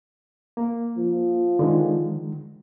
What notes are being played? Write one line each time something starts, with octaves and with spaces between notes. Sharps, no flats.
A#3
F3
D3 D#3 G#3